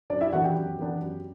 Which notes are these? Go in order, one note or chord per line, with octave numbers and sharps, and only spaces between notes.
F#2 D4 D5
E4 E5
E3 B3 D4 F#4 F#5
G4 G5
F#2
E3 B3 D4
F#2